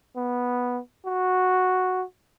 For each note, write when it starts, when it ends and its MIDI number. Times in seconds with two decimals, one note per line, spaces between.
0.16 0.79 59
1.06 2.04 66